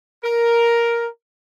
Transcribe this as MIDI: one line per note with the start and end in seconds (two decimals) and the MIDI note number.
0.24 1.07 70